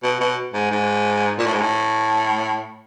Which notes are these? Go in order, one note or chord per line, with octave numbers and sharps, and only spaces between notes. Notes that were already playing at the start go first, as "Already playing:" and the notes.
B2
B2
G#2
G#2
A#2
A2
G#2
A2